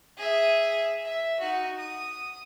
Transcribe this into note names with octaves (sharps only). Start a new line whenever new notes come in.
G#4 E5
E5
D#4 F#4
D#6